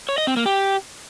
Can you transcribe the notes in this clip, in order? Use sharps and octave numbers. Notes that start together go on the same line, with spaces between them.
C#5
D#5
C4
A#3
G4